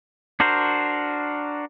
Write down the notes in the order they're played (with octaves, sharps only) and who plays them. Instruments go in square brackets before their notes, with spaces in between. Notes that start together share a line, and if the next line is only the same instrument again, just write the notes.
[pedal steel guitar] D4 F#4 A#4 C5